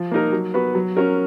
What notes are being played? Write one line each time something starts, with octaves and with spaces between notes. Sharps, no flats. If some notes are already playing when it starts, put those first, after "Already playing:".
Already playing: F3
A#3 D#4 A#4
F#3
B3 F#4 B4
F#3
C#4 F#4 A#4